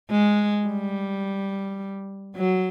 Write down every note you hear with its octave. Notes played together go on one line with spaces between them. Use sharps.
G#3
G3
F#3